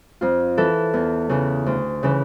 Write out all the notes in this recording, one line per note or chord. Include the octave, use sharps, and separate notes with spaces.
F2 F4
E3 A4
E2
C#3 E3
D2
C#3 E3